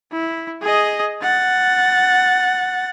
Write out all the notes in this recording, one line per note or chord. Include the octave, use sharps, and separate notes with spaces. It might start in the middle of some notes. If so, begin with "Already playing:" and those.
E4
G#4 D#5
F#5 A6